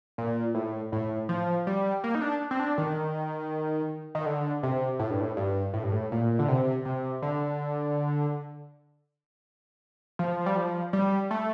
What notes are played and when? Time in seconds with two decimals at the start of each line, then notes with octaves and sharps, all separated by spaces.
0.18 A#2
0.55 A2
0.92 A2
1.29 F3
1.67 G3
2.04 A#3
2.15 D#4
2.22 D4
2.51 C4
2.60 D4
2.78 D#3
4.15 D#3
4.26 D3
4.63 C3
4.99 A2
5.11 G2
5.21 A2
5.37 G2
5.74 A2
5.83 G2
5.92 A2
6.12 A#2
6.39 D3
6.48 C3
6.85 C3
7.22 D3
10.19 F3
10.46 G3
10.56 F3
10.93 G3
11.31 A3